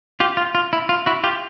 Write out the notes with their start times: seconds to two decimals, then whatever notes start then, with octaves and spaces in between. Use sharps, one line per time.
0.20 F4 G4
0.37 F4
0.55 F4
0.73 E4
0.89 F4
1.06 E4 F#4
1.24 F4 G4